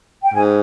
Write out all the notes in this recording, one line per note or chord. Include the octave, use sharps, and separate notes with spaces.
G5
G#2 G#5